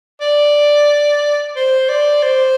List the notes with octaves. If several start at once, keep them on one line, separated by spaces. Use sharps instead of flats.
D5
C5
D5
C5